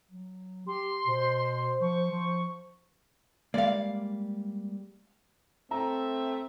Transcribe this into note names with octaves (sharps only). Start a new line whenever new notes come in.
F#3
G4 C6
B2 C5
F3 C#6
F3
G3 G#3 A#3 D5 F5
A3 C4 E5 A#5